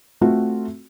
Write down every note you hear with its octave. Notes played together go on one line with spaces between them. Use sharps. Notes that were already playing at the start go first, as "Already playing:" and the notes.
A3 C4 F4 F#4